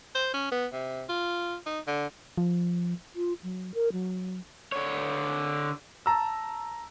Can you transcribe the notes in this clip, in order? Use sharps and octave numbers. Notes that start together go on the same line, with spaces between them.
C5
C#4
B3
C3
F4
D#4
D3
F3
F4
F#3
A#4
F#3
D3 C#5
A5 A#5 E6